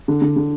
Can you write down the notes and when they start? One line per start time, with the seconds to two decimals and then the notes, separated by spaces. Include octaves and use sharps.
0.08 D3
0.22 D3
0.36 D3